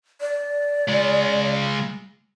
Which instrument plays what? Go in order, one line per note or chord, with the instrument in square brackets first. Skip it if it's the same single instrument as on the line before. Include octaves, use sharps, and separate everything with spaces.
[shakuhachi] D5
[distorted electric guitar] C#3 G#3